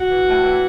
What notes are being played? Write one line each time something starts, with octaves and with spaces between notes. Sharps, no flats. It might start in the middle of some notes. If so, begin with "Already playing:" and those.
Already playing: F#4
E3
A2
E3